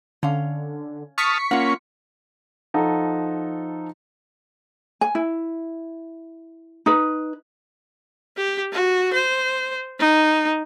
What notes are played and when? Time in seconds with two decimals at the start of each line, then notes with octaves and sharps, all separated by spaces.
0.23 D3 C#4 F5
1.18 A5 C#6 D#6 F6 B6 C#7
1.51 A#3 C#4 F4 F#5
2.74 F3 D#4 A4 F#5 A#5
5.01 G#5
5.15 E4
6.86 D#4 B4
8.37 G4
8.73 F#4
9.13 C5
9.99 D#4